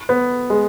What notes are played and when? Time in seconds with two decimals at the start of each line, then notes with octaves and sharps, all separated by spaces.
0.09 B3
0.50 G#3